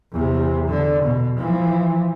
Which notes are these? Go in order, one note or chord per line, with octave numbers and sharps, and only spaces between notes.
E2 C3
D3
B2
E3 F3